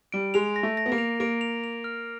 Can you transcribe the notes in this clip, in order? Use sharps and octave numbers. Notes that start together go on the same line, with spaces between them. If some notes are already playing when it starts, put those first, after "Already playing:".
G3 D7
G#3 F7
A#6
A3
A#6
B3
A#3
F7
A#3 D7
F7
F7
F6